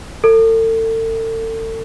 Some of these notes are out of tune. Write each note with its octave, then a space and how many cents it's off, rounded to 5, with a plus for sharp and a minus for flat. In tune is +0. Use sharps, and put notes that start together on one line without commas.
A4 +35